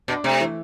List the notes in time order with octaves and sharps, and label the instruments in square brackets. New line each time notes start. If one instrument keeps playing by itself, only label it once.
[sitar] B2 [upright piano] D4
[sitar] C3 [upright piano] A3
[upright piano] E3